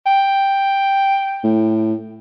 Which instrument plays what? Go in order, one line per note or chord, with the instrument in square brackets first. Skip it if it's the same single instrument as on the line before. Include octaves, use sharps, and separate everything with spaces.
[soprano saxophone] G5
[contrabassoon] A2